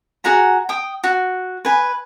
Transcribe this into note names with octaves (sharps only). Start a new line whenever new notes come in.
F#4 G#4 F#5 A#5
G5 D#6
F#4
B4 G#5